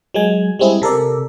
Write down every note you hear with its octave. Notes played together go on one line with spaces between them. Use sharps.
F#3 G#3 G#5
G3 G#3 C4 E4 G#4
C3 A4 A#4 D5